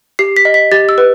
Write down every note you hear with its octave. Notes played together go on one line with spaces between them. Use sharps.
G4 C7
B6
D#5
B6
G4 A6
E6
B4